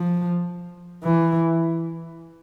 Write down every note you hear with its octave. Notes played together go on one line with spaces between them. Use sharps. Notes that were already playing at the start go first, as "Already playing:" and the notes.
Already playing: F3
E3